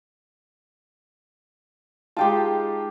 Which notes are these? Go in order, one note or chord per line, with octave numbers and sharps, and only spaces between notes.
G#3 D#4 F4 G4 G5 A5